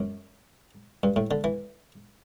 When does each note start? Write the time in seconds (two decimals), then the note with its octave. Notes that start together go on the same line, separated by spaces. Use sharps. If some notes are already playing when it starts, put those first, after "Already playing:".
Already playing: F#2
1.03 G2
1.16 A2
1.31 D3
1.44 E3